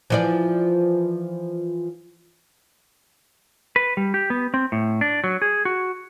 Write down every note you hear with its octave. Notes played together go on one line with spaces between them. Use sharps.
E3 F3 D5
B4
G3
G4
B3
C4
A2
D4
F#3
G#4
F#4